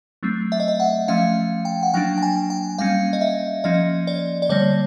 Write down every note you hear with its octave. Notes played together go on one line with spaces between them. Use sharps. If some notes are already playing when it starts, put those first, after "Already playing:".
F#3 A3 C4
E5
D#5
E5
F#5
F3 A3 C#4 F5
G5
F#5
F#3 A#3 D4 G5
G5
G#5
G5
G3 A#3 C#4 F5
D#5
E5
F3 A#3 C#4 D#5
D5
D5
D3 G3 A#3 C#5